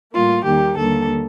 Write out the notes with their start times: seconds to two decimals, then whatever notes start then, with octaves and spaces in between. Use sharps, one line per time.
0.12 A2 G3 A#3 F4
0.44 D#2 D#3 G3 A#3 G4
0.77 D#2 D3 G3 A#3 A4